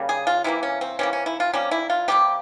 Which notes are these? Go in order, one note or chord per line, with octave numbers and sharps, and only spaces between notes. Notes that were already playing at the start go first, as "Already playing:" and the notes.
Already playing: C#3 G3 A#3
G#4
F4
C3 E3 A#3 E4
C#4
C4
C3 E3 A#3 C#4
C#4
E4
F4
C3 G3 A#3 C#4
E4
F4
C3 G3 A#3 G4